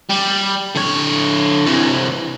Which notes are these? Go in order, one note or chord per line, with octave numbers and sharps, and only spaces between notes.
G3
D3 C#5
C3 E3